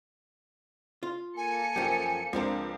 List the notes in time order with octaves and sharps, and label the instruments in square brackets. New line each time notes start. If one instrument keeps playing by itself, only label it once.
[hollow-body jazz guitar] F4
[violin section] A#3 A4 C#7 [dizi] G#5
[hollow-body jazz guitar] F#2 F3 [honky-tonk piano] G4
[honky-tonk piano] C#2 D4 [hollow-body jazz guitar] F3 C4 A#4